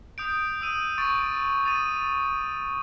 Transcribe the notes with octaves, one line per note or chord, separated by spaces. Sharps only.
D#6 G6 D7
D#6 E6 D#7
C#6 A6 D7
D#6 A6 D#7